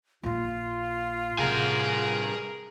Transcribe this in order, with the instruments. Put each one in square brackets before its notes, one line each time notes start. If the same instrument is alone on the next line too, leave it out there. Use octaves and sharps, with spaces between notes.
[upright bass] A#1 A#2 [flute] F4
[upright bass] A1 C3 [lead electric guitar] G2 G#5 [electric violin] G#4 A#4